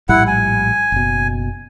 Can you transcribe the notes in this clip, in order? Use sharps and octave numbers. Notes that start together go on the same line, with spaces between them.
A#1 A2 G3 E4 F#5
G#5
F#1 B2